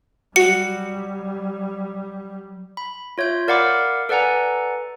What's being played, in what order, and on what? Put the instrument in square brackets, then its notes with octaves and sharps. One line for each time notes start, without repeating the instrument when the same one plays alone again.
[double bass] F#3 G3 [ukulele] F#4 [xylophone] C#7
[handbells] B5
F4 C#5 E5 G6
A#4 D5 F5 F#5 B5 D6
A4 B4 D5 F#5 G#5 A#5